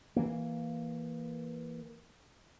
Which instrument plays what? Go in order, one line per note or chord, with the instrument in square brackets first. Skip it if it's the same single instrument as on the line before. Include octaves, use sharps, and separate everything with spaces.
[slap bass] E3 A#3